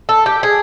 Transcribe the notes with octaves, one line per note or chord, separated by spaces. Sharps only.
A4
G4
G#4